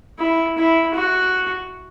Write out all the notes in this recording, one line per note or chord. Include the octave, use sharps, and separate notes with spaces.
E4
E4
F#4